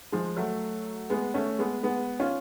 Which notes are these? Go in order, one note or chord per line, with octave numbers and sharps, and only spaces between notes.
F3 G#3
F#3 A3
G#3 B3
A3 C#4
G#3 B3
G#3 B3
C#4 F4